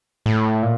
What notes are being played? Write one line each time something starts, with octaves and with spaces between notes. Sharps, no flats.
A2
A#2